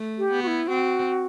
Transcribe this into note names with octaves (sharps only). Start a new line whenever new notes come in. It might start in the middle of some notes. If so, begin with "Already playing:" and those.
Already playing: A3
G4
B3
F#4
E4
C4 F#4